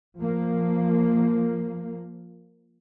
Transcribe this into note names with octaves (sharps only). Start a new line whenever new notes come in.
F3 A#3